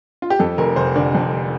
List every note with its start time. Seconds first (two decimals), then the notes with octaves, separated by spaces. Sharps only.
0.22 F4
0.30 G4
0.39 F2 A4
0.58 F1 A#4
0.76 F1 C5
0.96 D3 D5
1.15 F2